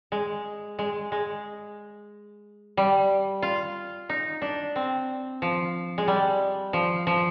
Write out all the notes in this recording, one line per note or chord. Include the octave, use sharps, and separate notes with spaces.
G#3
G#3
G#3
G3
F4
D#4
D4
C4
F3
G#3
G3
F3
F3